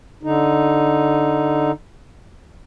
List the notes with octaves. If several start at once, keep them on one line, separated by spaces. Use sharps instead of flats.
D3 D#4